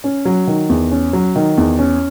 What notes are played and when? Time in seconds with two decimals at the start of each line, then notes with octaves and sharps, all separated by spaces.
0.04 C#4
0.25 F#3
0.47 D#3
0.69 E2
0.91 C#4
1.13 F#3
1.36 D#3
1.57 E2
1.79 C#4